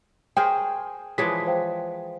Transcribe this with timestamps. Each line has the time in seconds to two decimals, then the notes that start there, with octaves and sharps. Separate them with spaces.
0.37 G#4 A#4 C5 C#5 G5 G#5
1.18 E3 F3 G#3 G#4 C#5 D5 B6
1.47 C5 F5 G5